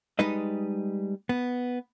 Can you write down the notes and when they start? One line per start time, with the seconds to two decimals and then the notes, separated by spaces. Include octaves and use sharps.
0.19 G3 G#3 D#4 B4 D#5
1.29 B3